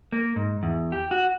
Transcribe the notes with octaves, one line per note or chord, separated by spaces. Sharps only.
A#3
G#2
E2
G4
F#4